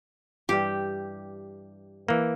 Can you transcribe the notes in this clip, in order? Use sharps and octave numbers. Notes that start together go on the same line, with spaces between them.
G2 E3 G3 G4
E3 A#3